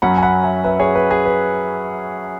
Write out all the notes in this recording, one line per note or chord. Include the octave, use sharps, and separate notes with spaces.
F#2 F#3 C#4 F#5 B5
G#5
F#5 B5
E5 G#5
B4 E5
G#4 C#5
B4
G#4
B4